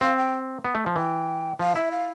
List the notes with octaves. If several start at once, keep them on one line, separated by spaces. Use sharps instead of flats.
C4 F5
G5
B3
A3
F3
E3 G5
F3 F5
E4 E5
F5